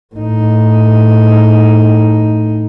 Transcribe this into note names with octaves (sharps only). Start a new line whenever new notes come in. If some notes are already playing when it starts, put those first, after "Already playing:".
A2 D#4